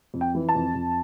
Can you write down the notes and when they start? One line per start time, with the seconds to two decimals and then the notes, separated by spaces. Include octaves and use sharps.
0.14 F2
0.21 G5
0.35 E3
0.49 A5
0.55 F2
0.75 F2